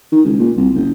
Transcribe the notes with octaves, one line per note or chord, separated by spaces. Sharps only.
D#3
C#2
A#2
C2
F#1